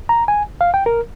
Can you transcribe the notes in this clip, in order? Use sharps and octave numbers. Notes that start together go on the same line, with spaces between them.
A#5
G#5
F5
G5
A#4